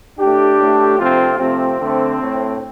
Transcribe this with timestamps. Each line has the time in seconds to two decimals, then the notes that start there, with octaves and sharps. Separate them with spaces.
0.19 A2 A3 D4 G4
0.60 A2 A3
0.99 C3 F3 A3 C4 F4
1.38 C3 F3 A3 C4
1.79 D3 A3
2.18 A2 A3